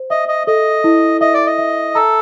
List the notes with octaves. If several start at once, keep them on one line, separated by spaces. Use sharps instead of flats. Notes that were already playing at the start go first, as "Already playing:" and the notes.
Already playing: C5
D#5 E5
D#5
A4 D#5
E4
D#5 E5
D5
D#5
E5
A4 A#5